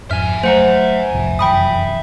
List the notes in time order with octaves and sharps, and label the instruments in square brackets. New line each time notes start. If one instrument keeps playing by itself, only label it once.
[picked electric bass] F2 G#2 [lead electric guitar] E5 G#5 [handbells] F6
[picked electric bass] F#3 A3 [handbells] C5 F#5 A#5
[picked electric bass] C2 F2 A2
[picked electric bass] F1 F#2 E3 [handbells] G5 B5 D#6